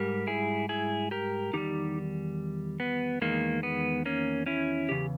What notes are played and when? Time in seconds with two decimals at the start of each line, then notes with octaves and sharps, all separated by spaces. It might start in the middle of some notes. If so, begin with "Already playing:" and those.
Already playing: G#2 G3 G4 A#4
0.27 E4 G#4
0.69 E4 G#4
1.11 G4 A#4
1.53 E2 D#3 G3 D#4 G4
2.80 B3
3.21 E2 D#3 G#3 A#3
3.63 B3
4.05 A#3 C#4
4.46 C#4 E4
4.89 E2 C#3 G4